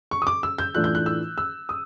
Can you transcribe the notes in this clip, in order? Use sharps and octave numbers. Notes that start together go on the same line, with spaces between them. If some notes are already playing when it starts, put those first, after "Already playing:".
C#6
D#6
D6
E6
G6
A2 E3 A3 D4 F4 F#6
G6
F#6
E6
E6
D#6